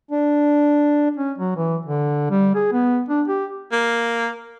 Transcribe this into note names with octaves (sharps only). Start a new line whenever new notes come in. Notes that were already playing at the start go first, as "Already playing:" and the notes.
D4
C#4
F#3
E3
D3
G3
G#4
B3
D4
G4
A#3